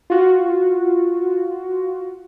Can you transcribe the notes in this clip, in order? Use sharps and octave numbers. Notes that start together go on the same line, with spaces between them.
F4 F#4